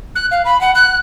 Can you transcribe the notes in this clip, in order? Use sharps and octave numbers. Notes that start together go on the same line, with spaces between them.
F#6
F5
B5
F#5
F#6